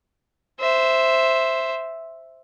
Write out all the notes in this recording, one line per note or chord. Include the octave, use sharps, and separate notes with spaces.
C5 E5